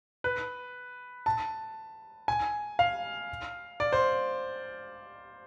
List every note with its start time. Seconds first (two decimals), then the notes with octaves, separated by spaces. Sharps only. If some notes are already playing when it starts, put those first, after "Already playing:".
0.24 B4
1.26 A5
2.28 G#5
2.79 F5
3.80 D5
3.93 C5